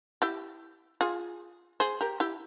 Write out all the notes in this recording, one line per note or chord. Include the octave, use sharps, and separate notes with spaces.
E4 G4
F4 G#4
G#4 C5
G4 A#4
E4 G4